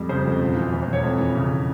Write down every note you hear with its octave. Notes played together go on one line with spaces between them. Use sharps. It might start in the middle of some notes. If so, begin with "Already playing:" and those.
Already playing: F2 G3
C#3 C5
F2
E1
E3
E2
C5
E1 C#5
F2
E3
C#3